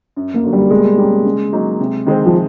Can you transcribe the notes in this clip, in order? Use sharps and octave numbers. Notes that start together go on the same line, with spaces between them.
F#2
A#3
D3 F#3
G3
B2 G#3
G3 A#3 C#4
C#3
F#3 A#3 D#4
C3
D#3 G#3 C4
F3